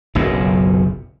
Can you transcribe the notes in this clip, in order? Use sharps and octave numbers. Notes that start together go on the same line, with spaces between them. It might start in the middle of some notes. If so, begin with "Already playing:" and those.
F#1 B1 F#2 A#2